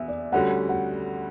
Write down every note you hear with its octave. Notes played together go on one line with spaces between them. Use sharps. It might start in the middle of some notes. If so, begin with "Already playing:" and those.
Already playing: E2 B3 E5
D5
D2 D3 G3 C#4 F#4 F#5
F#5